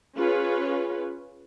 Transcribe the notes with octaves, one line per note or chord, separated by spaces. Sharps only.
C#4 F4 G#4 B4 C#5